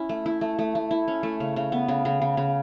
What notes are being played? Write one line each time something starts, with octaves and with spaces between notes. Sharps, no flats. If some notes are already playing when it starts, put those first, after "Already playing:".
Already playing: C#4 E4
A3
E4
A3
A3
A3
E4
C#4
A3
C#3
C#3
B3
C#3
C#3
C#3
C#3